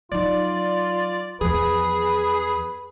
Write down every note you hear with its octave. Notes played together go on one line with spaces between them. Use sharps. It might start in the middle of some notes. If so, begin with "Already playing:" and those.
F#3 D#4 F4 D5
E2 F3 G#4 B4